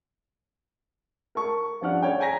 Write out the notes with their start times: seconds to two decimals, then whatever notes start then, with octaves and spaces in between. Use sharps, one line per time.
1.35 A#4 A5 C#6
1.81 G2 F3 C#4 D5 F#5 F6
2.02 C#5 D5 G5
2.20 G5 G#5 A#5 A#6 B6